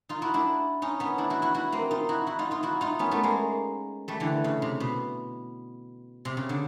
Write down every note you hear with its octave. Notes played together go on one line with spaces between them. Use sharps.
D#4 F4
E4 F#4
D4 E4
C#4 D#4
B3 C#4
D4 E4
E4 F#4
E4 F#4
E4 F#4
A#3 C4
D#4 F4
E4 F#4
E4 F#4
D#4 F4
D#4 F4
E4 F#4
D#4 F4
B3 C#4
A3 B3
G#3 A#3
G3 A3
D3 E3
C#3
C3
B2
C3
C#3
D3